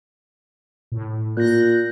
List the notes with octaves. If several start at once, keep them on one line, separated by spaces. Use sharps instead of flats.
A2
A#2 F#6 G6 A#6